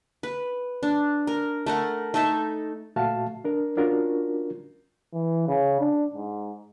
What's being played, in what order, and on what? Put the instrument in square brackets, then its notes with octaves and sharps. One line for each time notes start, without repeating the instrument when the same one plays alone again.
[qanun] B4
D4
A#4
A3 A#4 F#5
A3 D#4 A4 E5
[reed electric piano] A#2 A3 F#4 E5 F5 A5
D4 A#4
C#4 D4 F4 F#4 A#4
[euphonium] E3
C#3
D4
G#2